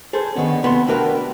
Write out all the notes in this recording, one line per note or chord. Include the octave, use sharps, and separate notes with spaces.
G#4 A4 B4 C5
D3 D#3 B3 C#4
D#2 C3 B3 F#4 B5 C6
A3 D4 F#4 G4 A#4 B4